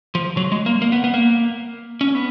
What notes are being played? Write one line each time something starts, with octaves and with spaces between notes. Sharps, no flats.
F3
F#3
G#3
A#3
A#3
B3
B3
A#3
C#4
B3